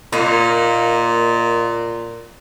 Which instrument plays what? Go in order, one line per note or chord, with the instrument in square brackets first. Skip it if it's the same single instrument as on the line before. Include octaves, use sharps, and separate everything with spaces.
[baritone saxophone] A#2 [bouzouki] A#3 D#4